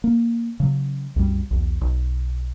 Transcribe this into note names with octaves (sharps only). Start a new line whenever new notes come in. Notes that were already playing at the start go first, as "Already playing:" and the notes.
A#3
C#3 F#3
C2 F#2 G3
B1 E2
B1